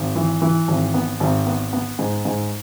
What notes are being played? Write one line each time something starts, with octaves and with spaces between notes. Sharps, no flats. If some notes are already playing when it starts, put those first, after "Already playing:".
Already playing: G#1
E3
E3
G#1
B3
G#1
B3
B3
G#2
G#2